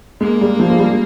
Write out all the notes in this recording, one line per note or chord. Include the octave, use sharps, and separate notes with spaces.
G#3 A#3
G3
F3
G#3
G3